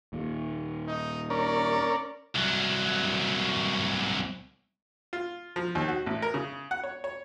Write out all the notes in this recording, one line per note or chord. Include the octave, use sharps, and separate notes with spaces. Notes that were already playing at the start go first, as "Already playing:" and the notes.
D#2 A#2
D#4
C#4 A#4 D5
C2 F#3
F4
F3
D#2
F#4
A1
A#4
C#3
F#5
C#5
C#5